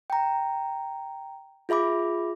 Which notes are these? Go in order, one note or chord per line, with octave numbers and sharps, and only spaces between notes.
G5 A#5
F4 G#4 E5 B5 D6